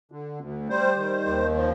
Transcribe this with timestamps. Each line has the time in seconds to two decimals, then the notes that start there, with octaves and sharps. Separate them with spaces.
0.12 D3
0.40 D2
0.69 G3 C5
0.97 D#3
1.26 D#2
1.54 F3